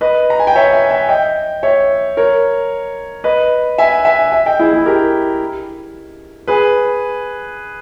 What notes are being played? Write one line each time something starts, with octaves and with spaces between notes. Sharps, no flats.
B4 D#5
A#5
G#5
G5
C#5 E5
E5 G#5
E5 G#5
D#5 G5
C#5 E5
A#4 C#5
B4 D#5
E5 G#5
E5 G#5
E5 G#5
D#5 G5
E4 G#4
E4 G#4
G4 A#4
G#4 B4